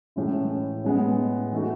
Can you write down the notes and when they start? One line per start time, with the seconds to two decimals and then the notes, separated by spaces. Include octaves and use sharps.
0.16 A2 E3 G#3 C#4 E4
0.84 A2 G#3 B3
1.52 E3 A3 D#4 F#4